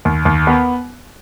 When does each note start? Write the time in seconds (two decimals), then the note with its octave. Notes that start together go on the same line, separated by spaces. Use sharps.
0.05 D#2
0.25 D#2
0.47 B3